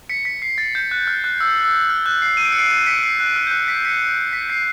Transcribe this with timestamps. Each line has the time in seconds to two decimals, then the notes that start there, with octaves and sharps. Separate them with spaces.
0.09 B6 C#7
0.25 B6
0.42 C7
0.58 A6
0.75 G6
0.91 F#6
1.07 F6
1.24 F#6
1.40 E6
1.64 E6
1.89 F6
2.06 F#6
2.22 C7
2.37 D#7
2.45 D7
2.52 C#7
2.58 C7 D7
2.87 B6 C#7
3.03 C7
3.20 F#6
3.36 F6
3.47 G6
3.51 F#6
3.68 B6
3.85 B6 C#7
4.33 B6 C#7
4.50 C7